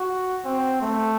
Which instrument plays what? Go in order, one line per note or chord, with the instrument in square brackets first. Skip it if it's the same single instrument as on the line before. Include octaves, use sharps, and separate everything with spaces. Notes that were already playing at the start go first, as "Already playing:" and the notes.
Already playing: [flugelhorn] F#4
C4
A3